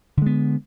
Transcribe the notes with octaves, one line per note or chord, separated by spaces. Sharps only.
D3 G#3 B3